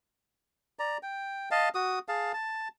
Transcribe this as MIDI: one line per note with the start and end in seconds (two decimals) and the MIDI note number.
0.79 0.98 74
0.79 0.98 82
1.03 1.49 79
1.51 1.69 75
1.51 1.69 77
1.51 1.69 81
1.75 1.99 66
1.75 1.99 87
2.09 2.32 68
2.09 2.32 77
2.09 2.32 81
2.34 2.68 81